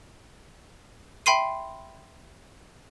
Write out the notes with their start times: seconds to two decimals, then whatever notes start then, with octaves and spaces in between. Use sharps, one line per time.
1.26 E5 G5 B5 C6 C7 D#7